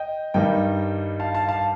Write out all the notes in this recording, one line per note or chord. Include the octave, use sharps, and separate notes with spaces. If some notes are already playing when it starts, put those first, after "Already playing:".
Already playing: D#5 G5
G2 D#3 G3 D#5 G5
F5 A5
F5 A5
F5 A5